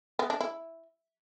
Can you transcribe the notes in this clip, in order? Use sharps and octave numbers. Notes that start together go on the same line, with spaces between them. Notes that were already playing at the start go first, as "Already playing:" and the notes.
B3
D4
E4